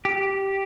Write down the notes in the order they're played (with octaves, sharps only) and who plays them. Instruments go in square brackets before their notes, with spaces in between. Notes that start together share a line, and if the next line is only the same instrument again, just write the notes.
[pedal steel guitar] G4